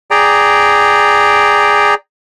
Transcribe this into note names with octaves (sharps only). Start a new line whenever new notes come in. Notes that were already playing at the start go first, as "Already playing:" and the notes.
G#4 D5 G5 A#5